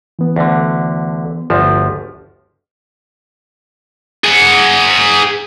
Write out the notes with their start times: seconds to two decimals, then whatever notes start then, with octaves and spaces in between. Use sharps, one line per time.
0.19 E3 B3
0.36 D2 D3
1.50 G1 D2 F3
4.25 G#4 F#5